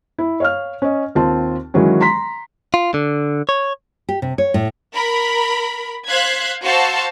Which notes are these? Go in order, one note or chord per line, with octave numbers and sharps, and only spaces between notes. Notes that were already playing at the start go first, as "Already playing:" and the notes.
E4
C#5 F5 F6
C#4 D#5
D#2 C4 F4 A5
D#3 E3 F#3 G#3 C#4
A#5 C6 B6
F4
D3
C#5
G4
C3
C#5
A2
A#4 B5
C5 F5 F#6 G#6 B6
F#4 C5 F5 A5 E6